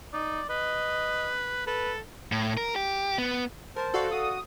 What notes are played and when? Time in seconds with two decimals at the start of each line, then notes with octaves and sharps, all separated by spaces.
0.13 D#4 D5
0.49 B4 D#5
1.67 A4 B4
2.32 A2
2.57 A#4
2.76 G4
3.18 B3
3.76 A#4 C5 A5
3.94 F#4 A4 D5 F5
4.11 F#4 D#6